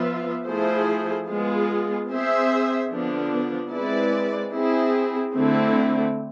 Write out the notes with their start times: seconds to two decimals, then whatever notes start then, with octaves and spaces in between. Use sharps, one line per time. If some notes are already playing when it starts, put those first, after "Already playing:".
Already playing: F3 B3 F4 B4 E5
0.46 F3 A3 E4 G#4 C5
1.28 G#3 B3 F4 G#4
2.10 C4 G#4 C5 E5
2.90 D3 F3 B3 D4
3.72 G#3 C4 E4 B4 D5
4.53 C4 E4 G#4
5.35 D3 A3 C4 E4